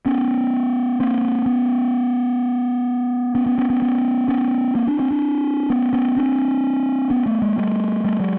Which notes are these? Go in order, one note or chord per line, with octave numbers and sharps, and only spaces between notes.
B3 C#4
A#3 C4
B3 C#4
B3 C#4
B3 C#4
B3 C#4
B3 C#4
B3 C#4
B3 C#4
A#3 C4
C4 D4
C4 D4
C4 D4
B3 C#4
B3 C#4
C4 D4
B3 C#4
A3 B3
G#3 A#3
G3 A3
G3 A3
F#3 G#3